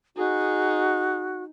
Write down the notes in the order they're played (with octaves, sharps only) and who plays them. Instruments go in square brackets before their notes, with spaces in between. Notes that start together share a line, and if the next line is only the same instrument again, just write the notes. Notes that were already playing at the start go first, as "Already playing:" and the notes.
[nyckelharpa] D#4 G#4 [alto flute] F#4